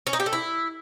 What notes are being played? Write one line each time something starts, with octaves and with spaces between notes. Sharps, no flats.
C#4
D#4
G4
A3
E4